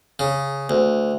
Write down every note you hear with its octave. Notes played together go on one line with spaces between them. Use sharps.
C#3
D2